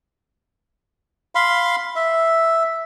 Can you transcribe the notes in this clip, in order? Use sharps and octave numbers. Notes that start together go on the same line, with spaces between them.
F5 B5 C6
E5